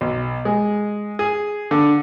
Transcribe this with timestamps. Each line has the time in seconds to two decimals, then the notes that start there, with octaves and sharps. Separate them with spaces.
0.01 B1
0.45 G#3
1.19 G#4
1.71 D3